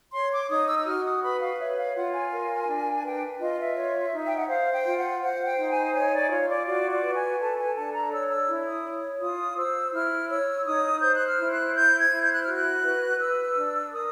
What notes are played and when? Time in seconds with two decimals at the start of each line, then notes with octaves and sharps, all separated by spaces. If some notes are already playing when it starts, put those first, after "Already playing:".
0.13 C#5 C6
0.32 D6
0.49 D#4 D#6
0.67 E6
0.78 E6
0.86 F#4 F6
1.04 D#6
1.22 B4 B5
1.41 F5
1.58 C#5 E5
1.77 F5
1.95 F4 F#5
2.13 G#5
2.31 A#4
2.68 D4
3.04 B4 G5
3.40 F4 D#5
3.59 E5
3.76 C#5
4.13 D#4
4.27 G5
4.37 F#5
4.49 C5 F5
4.73 G5
4.86 F4
4.98 F#5
5.22 C5 F#5
5.46 G5
5.57 D#4
5.70 G#5
5.94 C#5 G#5
6.13 D5
6.30 F4 C#5
6.49 D5
6.66 F#4 D5
6.90 D5
7.02 B4
7.15 G#5
7.40 A4 A5
7.58 G#5
7.75 D4 A5
7.94 A#5
8.12 C#5 E6
8.30 E6
8.49 E4
8.66 D#6
8.84 C#5
9.20 F4 D#6
9.57 C5 E6
9.93 E4 F6
10.29 C#5 E6
10.66 D#4 D#6
11.01 C5 G6
11.14 F#6
11.27 F6
11.39 E4
11.51 F#6
11.75 C5 G6
11.99 G#6
12.11 E4
12.23 G6
12.33 F#6
12.43 F#4 F6
12.53 F#6
12.83 B4
13.19 B4 E6
13.56 D4
13.92 A#4 D#6